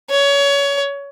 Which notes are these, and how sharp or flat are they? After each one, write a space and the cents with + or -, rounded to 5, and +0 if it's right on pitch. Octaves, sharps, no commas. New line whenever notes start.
C#5 +25